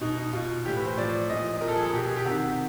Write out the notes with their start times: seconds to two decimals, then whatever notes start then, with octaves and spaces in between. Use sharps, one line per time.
0.01 B2 D#4
0.17 D#4
0.33 B2 F4
0.65 A2 E3 G4
0.76 B4
0.86 C5
0.97 A2 F3 D5
1.29 A#2 F3 D#5
1.61 A#2 F3 A#4
1.68 A4
1.75 G#4
1.83 A4
1.93 B2 G4
2.07 G#4
2.16 G4
2.25 C3 D#3 F#4